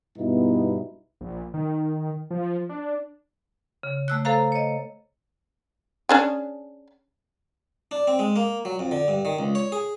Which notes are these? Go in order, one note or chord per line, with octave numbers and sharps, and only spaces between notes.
G2 B2 B3 D#4 E4
A#1
D#3
F3
D4
C#3
A3 E6 F#6
A4 C5 F5 A#5
C#5 D#5
C#4 D4 G#4
D4
C4
G#3
A#3
F#3
F2
D3
G2
D#3
C#2
C#5
G#4